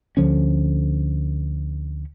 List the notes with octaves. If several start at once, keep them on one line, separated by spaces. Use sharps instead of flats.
D2 D3 F3 C#4